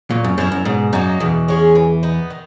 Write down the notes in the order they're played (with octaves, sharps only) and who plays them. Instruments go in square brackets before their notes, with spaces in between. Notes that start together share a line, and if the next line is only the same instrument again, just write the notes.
[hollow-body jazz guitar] A#2 [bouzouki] F#3
[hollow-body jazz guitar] F#2
[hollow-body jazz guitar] F#2 [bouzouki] C#4 E4 A#4
[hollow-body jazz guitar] F#2
[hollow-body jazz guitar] G#2 [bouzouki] B2
[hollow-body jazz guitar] F#2 [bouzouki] F#3 A#3 D#4
[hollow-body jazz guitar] E2 [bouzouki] B2
[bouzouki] G#3 C#4 G#4
E3
B3 D#4
D#3